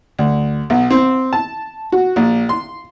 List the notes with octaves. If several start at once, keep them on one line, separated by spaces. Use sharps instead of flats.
D2
B1
C4
A5
F#4
A#1
C6